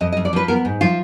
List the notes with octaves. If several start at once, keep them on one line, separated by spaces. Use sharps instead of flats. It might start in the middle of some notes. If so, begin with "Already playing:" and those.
F2 D#5
D#5
F2
D5
F3 B4
B3 A#4
G#2
F3 F4